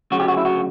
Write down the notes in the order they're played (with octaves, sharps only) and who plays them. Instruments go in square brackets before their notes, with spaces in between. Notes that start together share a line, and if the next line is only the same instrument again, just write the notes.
[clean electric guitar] D2 C#3 F#3 F#4
G4
F#4
E4
F#4